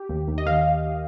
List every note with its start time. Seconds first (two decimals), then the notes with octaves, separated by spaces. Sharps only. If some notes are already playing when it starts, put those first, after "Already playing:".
Already playing: G4
0.09 D#2
0.28 D#2
0.38 D#5
0.46 D#3 F5